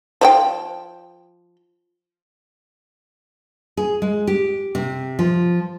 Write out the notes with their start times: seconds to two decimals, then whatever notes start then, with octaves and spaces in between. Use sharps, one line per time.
0.21 F3 D5 G5
3.77 G#4
4.02 G#3
4.27 G4
4.75 C3
5.19 F3